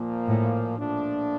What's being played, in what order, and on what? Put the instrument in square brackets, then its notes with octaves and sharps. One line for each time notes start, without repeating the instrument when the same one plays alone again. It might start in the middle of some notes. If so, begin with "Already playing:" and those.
Already playing: [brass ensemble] A#2 F3 A#3
[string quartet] A2
[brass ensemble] A#2 F3 A3 D4